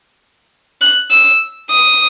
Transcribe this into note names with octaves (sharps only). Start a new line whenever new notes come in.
F#6
E6
D#6